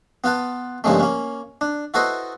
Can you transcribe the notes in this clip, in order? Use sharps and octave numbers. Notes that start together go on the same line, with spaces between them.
B3 F4 B4 A5
G2 A#2 C#3 F3 G#3 A3
A#3 C#4
D4
E4 F#4 A4 B4 C5 D#5